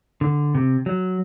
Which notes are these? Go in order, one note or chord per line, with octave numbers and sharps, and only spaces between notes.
D3
C3
F#3